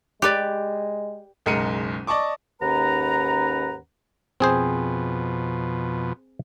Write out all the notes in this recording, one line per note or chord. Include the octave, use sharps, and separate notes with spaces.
G#3 G4 B4 D5
F#1 B1 G#3 A#4 C#7 D#7
D5 D#5 A5 C#6 D6
D#2 G#2 C#4 B4 F#5 A#5
F2 B2 C4 G#4 C5